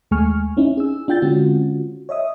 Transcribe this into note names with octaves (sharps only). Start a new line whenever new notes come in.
D#2 G#3 A3 G#5 C#6 F6
C4 C#4 D#4 E4
G#4 E6
D4 F4 G5 G6 A6
D3 G#3 C4 C#4 F4 F#4
C#5 D#5 E5 D#6